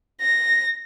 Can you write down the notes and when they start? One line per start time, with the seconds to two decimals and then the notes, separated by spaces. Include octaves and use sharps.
0.21 A#6